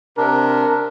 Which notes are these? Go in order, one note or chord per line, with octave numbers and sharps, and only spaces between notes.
C3 D4 A#4